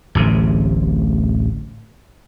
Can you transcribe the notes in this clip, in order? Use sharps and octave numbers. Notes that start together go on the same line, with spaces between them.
D1 A1 C3